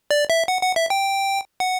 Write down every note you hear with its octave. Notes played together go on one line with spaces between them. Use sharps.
D5
E5
F#5
F#5
E5
G5
F#5